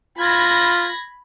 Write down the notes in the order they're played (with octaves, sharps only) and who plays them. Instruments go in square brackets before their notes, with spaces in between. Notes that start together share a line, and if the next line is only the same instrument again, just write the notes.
[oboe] F4 [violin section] B5 G#6 A#6